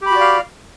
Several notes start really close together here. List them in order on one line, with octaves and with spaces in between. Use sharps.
G4 B5 F#4 D5 F5